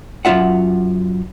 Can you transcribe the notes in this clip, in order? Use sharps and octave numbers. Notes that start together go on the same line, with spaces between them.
F#2 G#3 F4 E5 F#5